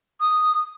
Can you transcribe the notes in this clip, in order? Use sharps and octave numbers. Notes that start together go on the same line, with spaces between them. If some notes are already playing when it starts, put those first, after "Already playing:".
D#6